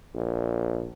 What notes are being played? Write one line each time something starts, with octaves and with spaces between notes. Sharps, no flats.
A#1